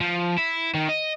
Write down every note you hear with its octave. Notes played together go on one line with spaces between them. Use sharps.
F3
E4
D#3
D#5